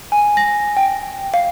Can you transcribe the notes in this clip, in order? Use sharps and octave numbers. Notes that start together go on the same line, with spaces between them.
G#5
A#6
G5
F5